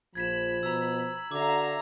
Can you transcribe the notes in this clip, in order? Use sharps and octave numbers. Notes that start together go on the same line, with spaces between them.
A#1 F3 B5 G#6 B6 E7
B2 A#5 E6
D3 F#4 E5 F5 A#5 D6